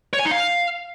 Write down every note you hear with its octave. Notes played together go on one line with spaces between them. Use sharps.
C#5
G#5
D#4
F5